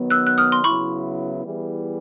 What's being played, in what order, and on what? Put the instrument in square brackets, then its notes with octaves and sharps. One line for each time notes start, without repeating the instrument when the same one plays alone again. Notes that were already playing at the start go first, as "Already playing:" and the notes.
Already playing: [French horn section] D#3 F#3 B3
[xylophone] E6 F#6
F#6
D#6 F6
C6
[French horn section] C#3 F#3 B3 E4 [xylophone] B5 C#6
[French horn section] E3 G3 B3 E4 G#4